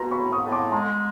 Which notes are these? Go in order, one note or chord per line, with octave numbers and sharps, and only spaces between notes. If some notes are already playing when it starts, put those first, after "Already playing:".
Already playing: B2 A#5 C6
B5 C#6
A2
C#6 D#6
A2
C6 D6
G#3 A#5 C6